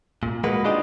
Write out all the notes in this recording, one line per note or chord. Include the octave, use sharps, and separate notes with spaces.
A#2
G#3 A#3 F#4 B4
D4 D#4 F4 G4 G#4 D#5